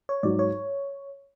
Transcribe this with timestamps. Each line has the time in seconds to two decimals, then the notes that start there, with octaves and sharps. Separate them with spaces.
0.09 C#5
0.23 G#2 F#3 D5
0.39 C#5